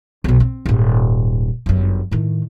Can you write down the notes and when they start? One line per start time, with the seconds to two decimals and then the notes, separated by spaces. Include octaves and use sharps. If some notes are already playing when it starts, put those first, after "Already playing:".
0.24 B1 B2
0.40 C4
0.66 D#1 G#2
1.66 G1 F#2
2.11 A2 D#3